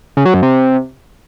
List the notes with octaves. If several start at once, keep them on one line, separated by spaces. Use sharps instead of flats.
C#3
F#3
F#2
C3